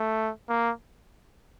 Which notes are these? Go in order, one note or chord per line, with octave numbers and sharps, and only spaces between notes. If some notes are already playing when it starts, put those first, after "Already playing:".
Already playing: A3
A#3